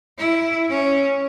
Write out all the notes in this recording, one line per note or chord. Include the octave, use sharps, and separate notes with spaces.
E4
C#4